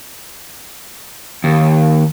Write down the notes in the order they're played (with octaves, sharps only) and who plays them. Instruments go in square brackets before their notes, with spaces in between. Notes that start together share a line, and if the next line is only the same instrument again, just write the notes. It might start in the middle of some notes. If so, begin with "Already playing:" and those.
[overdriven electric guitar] D#2